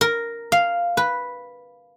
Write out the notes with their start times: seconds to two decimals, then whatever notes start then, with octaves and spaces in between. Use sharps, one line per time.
0.01 A#4
0.52 F5
0.97 B4